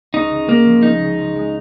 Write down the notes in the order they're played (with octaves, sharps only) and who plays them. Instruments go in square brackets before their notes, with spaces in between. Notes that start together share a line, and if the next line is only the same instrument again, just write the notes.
[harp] C#2 [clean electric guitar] D#4
[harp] C#3
[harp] C#3 [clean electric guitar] A#3
[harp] F3
[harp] G#3 [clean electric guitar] D#4
[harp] C#3
F3
G#3